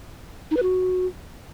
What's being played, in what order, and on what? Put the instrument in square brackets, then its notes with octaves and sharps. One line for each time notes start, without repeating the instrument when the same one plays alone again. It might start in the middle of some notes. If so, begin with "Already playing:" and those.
[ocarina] D#4
B4
F#4